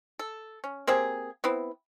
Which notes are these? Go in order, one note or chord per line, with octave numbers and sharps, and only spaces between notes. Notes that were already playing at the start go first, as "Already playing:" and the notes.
A4
C#4
A#3 C4 G4 G#4
B3 C4 E4